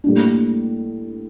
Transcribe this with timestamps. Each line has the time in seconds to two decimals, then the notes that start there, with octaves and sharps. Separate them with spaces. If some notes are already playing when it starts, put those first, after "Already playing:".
0.04 A2 G3 A#3 D4